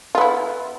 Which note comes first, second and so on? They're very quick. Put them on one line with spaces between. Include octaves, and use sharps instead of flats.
F4 B3 E4